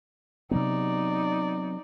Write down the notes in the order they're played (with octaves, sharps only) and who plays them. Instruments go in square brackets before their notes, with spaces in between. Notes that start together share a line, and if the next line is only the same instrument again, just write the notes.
[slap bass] C3 F#3 B3 [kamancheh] D#4 D5